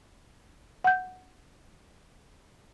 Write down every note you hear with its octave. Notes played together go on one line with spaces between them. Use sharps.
F#5 G6